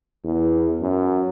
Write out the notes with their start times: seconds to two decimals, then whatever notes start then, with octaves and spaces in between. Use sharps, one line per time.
0.24 E2
0.81 F#2